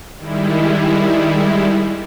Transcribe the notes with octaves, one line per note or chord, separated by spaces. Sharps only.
D#3 G3 G#3 E4